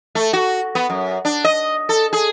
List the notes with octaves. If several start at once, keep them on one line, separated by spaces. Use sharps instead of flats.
A3
F#4
B3
F#2
D4
D#5
A4
G#4